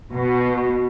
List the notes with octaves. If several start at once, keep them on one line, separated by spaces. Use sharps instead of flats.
B2